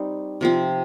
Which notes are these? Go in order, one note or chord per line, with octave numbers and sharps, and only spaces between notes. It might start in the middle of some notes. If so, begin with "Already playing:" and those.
Already playing: G3 C4 D#4
C3 F3 C4